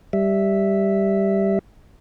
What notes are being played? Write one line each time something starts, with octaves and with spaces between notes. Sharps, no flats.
G3 E5